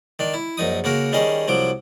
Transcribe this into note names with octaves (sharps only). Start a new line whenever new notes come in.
D#3 D4
E4
A#1 F#2 D#4 D#6
C#3 A#3 F#4 A#4
D#3 G3 C#4 G#4 D#5
C2 F3 F#3 D6